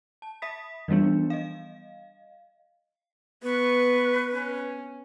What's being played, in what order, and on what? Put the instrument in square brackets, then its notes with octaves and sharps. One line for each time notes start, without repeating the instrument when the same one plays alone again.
[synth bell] A5
E5 B5 D#6 B6
E3 F3 G3 B3 D4
D#5 F5
[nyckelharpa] B3 C#6 [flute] B4
[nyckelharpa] C#4